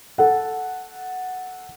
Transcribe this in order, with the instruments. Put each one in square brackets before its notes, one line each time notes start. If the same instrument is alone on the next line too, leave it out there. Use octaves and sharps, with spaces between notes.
[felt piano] A4 F#5